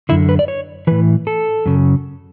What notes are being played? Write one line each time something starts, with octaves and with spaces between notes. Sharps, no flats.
F#2 D3 E4
B4
D5
C#5
A2 E3 B4
A4
F#2 C#3